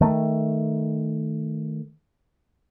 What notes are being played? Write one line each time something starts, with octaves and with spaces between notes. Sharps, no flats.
D#3 A3